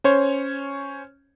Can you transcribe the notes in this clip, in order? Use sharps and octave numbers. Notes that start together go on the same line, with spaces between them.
C#4 C5 C#5